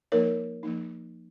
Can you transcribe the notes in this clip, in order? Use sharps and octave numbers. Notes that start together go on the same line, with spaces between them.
F3 A#3 D#4 A#4 C#5
F3 A#3 D#4